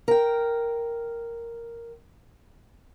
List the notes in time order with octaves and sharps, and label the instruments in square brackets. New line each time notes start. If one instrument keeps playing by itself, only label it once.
[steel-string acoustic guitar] A#4 G5